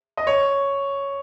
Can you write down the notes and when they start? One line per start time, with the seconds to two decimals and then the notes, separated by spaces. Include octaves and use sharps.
0.17 D#5
0.27 C#5